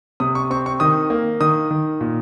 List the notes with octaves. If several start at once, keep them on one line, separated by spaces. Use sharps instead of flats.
C3 D#6
C#6
C4 C#6
C#6
D#3 D#6
A#3
D#3 D#6
D#3
A#2